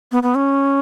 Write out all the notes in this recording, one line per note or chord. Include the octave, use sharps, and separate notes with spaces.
B3
B3
C#4